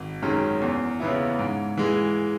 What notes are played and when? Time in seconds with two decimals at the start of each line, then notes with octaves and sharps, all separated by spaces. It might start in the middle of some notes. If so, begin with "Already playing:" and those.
Already playing: G#1
0.22 F#2 D#3 G#3 C#4
0.62 E2
1.00 C#3 E3 B3 E4
1.39 G#2
1.78 E3 G#3